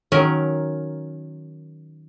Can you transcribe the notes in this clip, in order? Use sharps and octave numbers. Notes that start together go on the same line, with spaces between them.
D#3 F#3 C#4 A#4